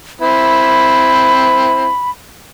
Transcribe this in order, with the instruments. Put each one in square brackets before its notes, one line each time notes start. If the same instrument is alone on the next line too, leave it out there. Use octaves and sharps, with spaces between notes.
[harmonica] C4 E4 [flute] B5